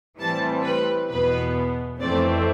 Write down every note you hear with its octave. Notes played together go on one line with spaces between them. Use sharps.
A2 E3 G3 C4 A5
B4
E2 B2 B3 B4
F2 E3 A3 C4 D5